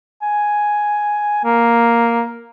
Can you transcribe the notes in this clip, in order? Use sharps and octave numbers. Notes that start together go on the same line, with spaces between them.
G#5
A#3